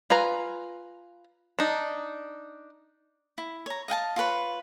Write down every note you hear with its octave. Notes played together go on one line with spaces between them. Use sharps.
F4 B4 G#5 A#5
D4 D#4
E4
C#5 A#5
D#5 F5 G5 A5
F4 G4 B4 C#5